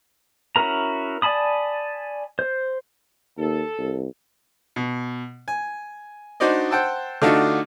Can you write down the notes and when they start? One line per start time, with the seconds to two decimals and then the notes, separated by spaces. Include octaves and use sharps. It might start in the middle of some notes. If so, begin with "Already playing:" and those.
0.56 C#4 E4 F#4 A#4 A#5
1.22 D5 G#5 A5 B5 D#6
2.39 C5
3.38 D#2 A4
3.78 C2
4.76 B2
5.48 G#5
6.40 D4 D#4 F#4 C5 D5 D#5
6.71 C5 F#5 G5 A5 E6
7.22 D3 A3 D4 D#4 F4 F#4